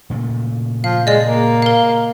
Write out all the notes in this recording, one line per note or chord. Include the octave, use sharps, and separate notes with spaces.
A#2 C#3 A3
F3 F5
G#3 D5 D#5
A#3
A#4 F5